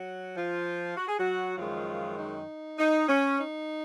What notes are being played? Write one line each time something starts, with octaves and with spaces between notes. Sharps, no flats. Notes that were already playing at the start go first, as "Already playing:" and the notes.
Already playing: F#3 F#4
F3 F4
F#4
G#4
F#3 F#4
F#2 D#3 F3 G#3 F4
D#4
D#4
C#4
D#4